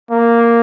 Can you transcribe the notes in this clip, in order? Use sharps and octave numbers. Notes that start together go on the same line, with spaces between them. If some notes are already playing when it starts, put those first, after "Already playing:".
A#3